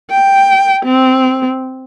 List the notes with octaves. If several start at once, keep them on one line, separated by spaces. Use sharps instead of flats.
G5
C4